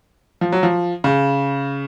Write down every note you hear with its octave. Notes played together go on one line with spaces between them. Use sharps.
F3
F#3
F3
C#3